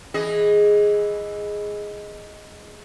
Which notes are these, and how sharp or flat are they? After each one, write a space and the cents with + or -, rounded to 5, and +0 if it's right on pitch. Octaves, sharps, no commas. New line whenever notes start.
E3 +0 G#4 +0 D#5 +0